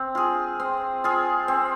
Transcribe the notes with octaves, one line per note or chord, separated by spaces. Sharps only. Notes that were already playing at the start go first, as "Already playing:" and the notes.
Already playing: C4
F4 G#4
C4
F4 G#4
C4